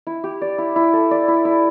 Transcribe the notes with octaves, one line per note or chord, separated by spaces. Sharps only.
E4
G4
D5
E4
E4
A4
D5
E4
E4